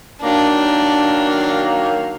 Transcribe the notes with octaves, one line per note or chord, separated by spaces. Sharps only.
D#3 F#3 A#3 D4